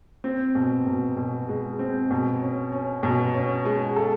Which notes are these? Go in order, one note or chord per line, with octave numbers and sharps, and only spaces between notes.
C4
B2
B2
B2
G#3
C4
B2
C#4
C#4
B2
C#4
G#3
A4